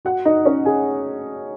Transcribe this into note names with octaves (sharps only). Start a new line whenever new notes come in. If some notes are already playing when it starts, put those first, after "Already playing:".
F#4 F#5
D#4 D#5
C#4 C#5
G#4 G#5